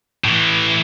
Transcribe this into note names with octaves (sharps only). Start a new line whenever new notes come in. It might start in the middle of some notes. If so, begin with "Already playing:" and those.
A2 E3